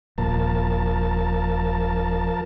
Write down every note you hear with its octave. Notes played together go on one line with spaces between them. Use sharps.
D#1 A#2 F3 A#4 A5